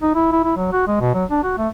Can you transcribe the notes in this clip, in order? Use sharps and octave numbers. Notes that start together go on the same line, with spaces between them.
D#4
E4
E4
E4
F#3
F#4
G#3
B2
F#3
D4
F#4
A3